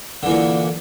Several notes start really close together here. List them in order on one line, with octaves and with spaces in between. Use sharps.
D3 E3 A#2